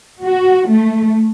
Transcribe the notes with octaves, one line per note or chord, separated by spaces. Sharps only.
F#4
A3